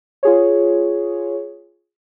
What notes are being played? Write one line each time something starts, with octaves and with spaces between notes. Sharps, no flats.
F4 G#4 C#5